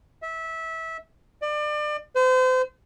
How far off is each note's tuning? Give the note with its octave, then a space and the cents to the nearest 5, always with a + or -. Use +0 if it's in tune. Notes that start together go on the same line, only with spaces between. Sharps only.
E5 -20
D5 +30
C5 -35